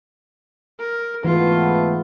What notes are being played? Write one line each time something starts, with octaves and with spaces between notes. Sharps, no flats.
A#4
G#2 E3 A3 B3 F4